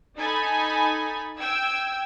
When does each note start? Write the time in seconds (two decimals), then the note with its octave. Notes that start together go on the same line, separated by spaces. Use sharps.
0.17 D#4 A4 G#5 B5
1.39 G5 E6 G#6